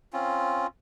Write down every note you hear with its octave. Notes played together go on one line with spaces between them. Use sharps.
C4 C#4 F4